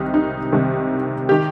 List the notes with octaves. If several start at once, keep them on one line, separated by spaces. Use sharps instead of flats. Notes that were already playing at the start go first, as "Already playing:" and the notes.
Already playing: C2 C3 D#3 D#4
D#4
C2 C3 D#3
D#3 G4